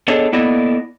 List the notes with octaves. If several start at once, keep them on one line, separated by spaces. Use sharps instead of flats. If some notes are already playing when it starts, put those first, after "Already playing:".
B3 D4 G#4 A4 C#5 D#5
A#3 B3 E4 A4 D5 D#5